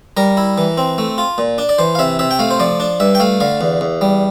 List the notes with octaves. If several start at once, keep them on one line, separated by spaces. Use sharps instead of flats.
G3 A#4
E4
E3
C4
A3
F4
A#2
D4
D5
E3 C5
F5
C3 E5
C3 E5
G5
A3 F5
C5
F3 D5
D4
G2 E5
G5
A3 F5
D3 F5
E2
E2
G3